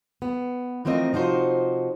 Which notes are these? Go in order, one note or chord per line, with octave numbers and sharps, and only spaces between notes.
B3
E3 F3 A3 C4 A#4 D#5
C3 F3 D#4 F#4 C5